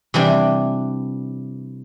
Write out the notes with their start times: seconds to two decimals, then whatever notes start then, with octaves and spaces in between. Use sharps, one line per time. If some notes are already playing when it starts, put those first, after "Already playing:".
0.14 C3 E3 G3 D4